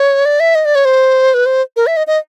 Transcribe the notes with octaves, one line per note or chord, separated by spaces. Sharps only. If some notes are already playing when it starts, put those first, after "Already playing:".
Already playing: C#5
D5
E5
D#5
D5
C#5
C5
B4
C5
A#4
E5
D#5
D#5